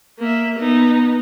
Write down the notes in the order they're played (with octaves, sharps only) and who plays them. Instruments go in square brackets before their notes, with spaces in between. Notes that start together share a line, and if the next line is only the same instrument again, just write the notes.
[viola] A#3 E5
B3 D#4